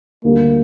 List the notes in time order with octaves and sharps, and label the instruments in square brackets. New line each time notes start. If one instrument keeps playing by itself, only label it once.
[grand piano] D2 D3 G3 [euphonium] A#3